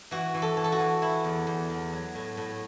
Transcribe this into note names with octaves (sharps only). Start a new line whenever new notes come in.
E3 F#4
E3
A4
E3
A4
F#4
E3
E3 E4
E2
E2
E2
F#3
A2
A2